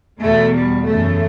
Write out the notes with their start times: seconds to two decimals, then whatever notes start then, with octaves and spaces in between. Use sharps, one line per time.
0.21 E2 B2 A3
0.55 G3
0.88 F#2 C#3 E3 A3